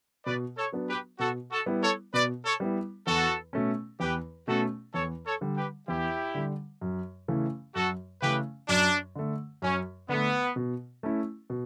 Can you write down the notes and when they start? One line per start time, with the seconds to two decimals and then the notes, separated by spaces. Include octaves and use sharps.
0.26 B2 B4 D5
0.57 A4 C#5
0.72 F#3 B3 D4
0.88 G4 B4
1.19 B2 F#4 A4
1.51 F#4 A4
1.66 G3 B3 E4
1.82 A4 C#5
2.13 B2 B4 D5
2.44 A4 C#5
2.60 G3 B3 E4
3.07 E2 F#4 A4
3.53 B2 A3 C#4
4.00 E2 G4 B4
4.47 B2 A3 C#4 F#4 A4
4.94 E2 A4 C#5
5.25 A4 C#5
5.41 D3 G3
5.56 G4 B4
5.87 E2 E4 G4
6.34 D3 G3
6.81 F#2
7.28 C#3 E3 A3 C#4
7.75 F#2 F#4 A4
8.22 C#3 E3 A3 C#4 G4 B4
8.68 F#2 D4
9.16 D3 A3
9.62 F#2 C#4
10.09 D3 A3 B3
10.56 B2
11.03 A3 C#4 E4
11.50 B2